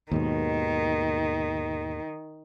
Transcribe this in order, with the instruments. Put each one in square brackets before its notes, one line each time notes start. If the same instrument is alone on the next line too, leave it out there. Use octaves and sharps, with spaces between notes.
[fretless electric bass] D#2 G#2 B2 [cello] D#3